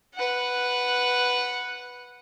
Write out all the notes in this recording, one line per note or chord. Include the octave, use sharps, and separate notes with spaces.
B4 F#5